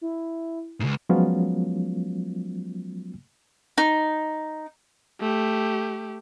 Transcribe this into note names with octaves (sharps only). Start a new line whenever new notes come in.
E4
C#2 G#2
F3 F#3 G#3 B3 C#4 F4
D#4
A3 G4